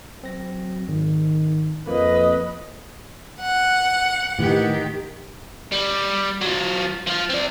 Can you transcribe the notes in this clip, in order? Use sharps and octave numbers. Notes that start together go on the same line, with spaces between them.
F#3 C4 A#6
G#1 D#3
F2 A#3 B4 D#5
F#5
A2 D#3 E3 G4
G3
F#3 F4
F3 F4
C4 D5